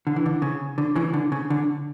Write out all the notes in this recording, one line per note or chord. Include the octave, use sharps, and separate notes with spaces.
D3
E3
D3
C#3
D3
C#3 E3
D3
C#3
D3